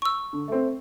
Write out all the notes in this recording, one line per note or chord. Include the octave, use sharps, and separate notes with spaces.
C#6 E6
D3
A3 C4